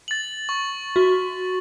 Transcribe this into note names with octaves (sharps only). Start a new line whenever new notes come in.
A6 F#7
C#6
F#4